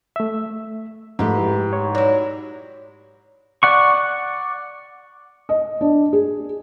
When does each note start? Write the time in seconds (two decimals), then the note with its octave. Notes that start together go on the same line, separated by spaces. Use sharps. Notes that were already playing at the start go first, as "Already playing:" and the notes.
0.16 A3 E5
1.19 G#2 F3 A3 G4 B4
1.38 E4
1.73 C#5
1.95 F#3 E4 D5
3.63 D5 F#5 C#6
5.49 D#5
5.81 D4
6.13 G#4